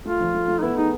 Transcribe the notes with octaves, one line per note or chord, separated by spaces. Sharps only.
A3 F4
F3
A3
A3
D#4
B3 E4
D#4 G#4